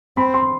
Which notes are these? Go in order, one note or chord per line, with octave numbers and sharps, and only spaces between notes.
C4 B5
C6